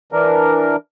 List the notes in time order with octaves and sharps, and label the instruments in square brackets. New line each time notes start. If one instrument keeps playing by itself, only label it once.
[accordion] E3 D4 A#4